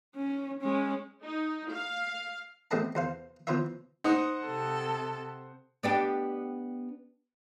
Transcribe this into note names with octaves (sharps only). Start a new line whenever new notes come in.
C#4
G#3 C#4
D#4
F5
A1 A3 B3 C4 D#5 A5
E2 C5 F5
E3 F3 B3 C5 C#5 E5
D#4 C5 F#5 D#6
C3 A4
B3 D4 G4